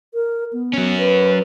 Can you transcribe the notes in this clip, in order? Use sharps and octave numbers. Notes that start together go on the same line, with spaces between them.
A#4
B3
F#3 C#4
B4